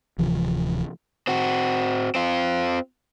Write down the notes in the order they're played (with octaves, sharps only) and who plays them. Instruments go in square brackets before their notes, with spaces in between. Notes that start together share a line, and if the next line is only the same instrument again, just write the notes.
[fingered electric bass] D1 C3 E3 F3
[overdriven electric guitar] C4 F#4
C4 F4